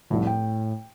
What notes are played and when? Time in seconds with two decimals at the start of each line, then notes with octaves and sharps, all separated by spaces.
0.10 F1 C2 A2
0.27 G5